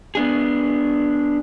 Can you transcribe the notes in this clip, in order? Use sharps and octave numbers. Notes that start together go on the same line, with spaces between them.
B3 D4 G#4